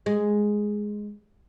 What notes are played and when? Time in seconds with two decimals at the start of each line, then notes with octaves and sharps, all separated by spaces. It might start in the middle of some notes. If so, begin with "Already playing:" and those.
0.06 G#3